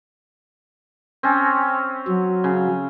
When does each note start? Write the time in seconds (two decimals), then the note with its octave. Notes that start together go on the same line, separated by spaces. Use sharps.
1.23 C4 C#4
2.08 F#3
2.44 C#3